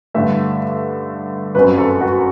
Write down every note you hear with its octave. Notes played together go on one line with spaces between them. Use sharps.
G2 D3 A3 E5
G1 F#2 F#3 C4 B4
A4
F#4